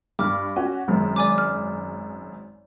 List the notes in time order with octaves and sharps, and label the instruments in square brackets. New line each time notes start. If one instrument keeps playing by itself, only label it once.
[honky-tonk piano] G2 [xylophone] D6 F6
[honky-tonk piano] C#4 F#4
G#1 F#2
[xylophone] D5 G#5 D6
F6